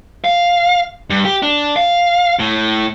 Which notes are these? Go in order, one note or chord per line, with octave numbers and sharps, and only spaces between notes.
F5
G2
G4
D4
F5
A2